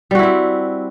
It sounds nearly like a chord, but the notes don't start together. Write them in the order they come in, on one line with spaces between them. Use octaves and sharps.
G3 F#4 E4 C4